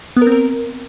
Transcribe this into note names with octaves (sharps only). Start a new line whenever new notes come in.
B3
A#4
C4
A#4